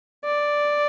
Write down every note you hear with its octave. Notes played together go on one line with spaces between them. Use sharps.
D5